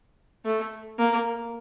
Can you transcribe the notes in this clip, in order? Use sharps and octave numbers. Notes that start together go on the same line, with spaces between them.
A3
A#3